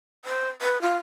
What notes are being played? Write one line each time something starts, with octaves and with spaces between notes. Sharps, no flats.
C5
B4
F4